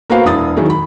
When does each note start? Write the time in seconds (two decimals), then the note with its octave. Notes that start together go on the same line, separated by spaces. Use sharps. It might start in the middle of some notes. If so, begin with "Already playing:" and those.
0.10 A#3 B3 F#4 B4 C5 F5
0.25 E1 E4 D#6 A6
0.56 D#3 F#3 G#3 E4
0.70 B5